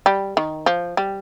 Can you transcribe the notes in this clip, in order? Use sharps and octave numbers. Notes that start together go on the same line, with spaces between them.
G3
D#3
F3
G3